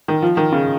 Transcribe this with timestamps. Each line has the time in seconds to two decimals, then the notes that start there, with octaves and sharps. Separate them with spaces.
0.08 D#3
0.22 F3
0.37 D#3
0.52 C#3